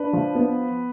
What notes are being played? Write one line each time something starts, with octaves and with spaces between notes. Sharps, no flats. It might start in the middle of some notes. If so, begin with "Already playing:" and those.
Already playing: D4 B4
F3
B3